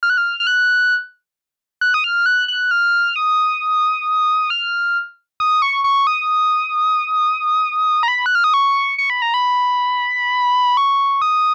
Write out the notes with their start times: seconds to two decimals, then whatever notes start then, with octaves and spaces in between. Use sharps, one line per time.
0.03 F6
0.10 F#6
0.18 F6
0.40 F6
0.47 F#6
1.81 F#6
1.94 D#6
2.04 F6
2.26 F#6
2.48 F#6
2.71 F6
3.16 D#6
4.50 F6
5.40 D#6
5.62 C#6
5.84 C#6
6.07 D#6
8.03 A#5
8.08 B5
8.26 F#6
8.35 F6
8.44 D#6
8.54 C#6
8.98 C#6
9.10 B5
9.22 A#5
9.34 B5
10.77 C#6
11.22 D#6